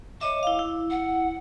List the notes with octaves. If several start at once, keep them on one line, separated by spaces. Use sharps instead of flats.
C#5 D#5 E5 D6
E4 F5
E4
F#5